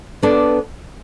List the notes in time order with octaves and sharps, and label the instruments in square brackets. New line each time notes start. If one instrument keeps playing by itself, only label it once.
[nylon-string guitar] B3 D4 A4 D5